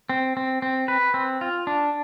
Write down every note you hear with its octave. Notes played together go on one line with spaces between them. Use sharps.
C4
C4
C4
B4
C4
F4
D4